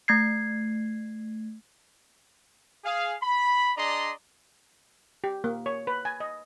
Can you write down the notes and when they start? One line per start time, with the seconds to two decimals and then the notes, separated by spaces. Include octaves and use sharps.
0.08 A3 G#6 C7
2.85 G#4 F5
3.22 B5
3.77 D4 G#4 D5 D#5 A#5 C6
5.24 G4
5.44 A#3
5.66 C#5
5.87 B4
6.05 G#5
6.20 D#5